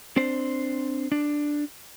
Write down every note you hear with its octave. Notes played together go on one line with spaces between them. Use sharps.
C4 D4 C5
D4